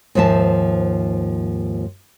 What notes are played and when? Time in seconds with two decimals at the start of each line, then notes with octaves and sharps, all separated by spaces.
0.15 D#2 G#2 F3 E5 A5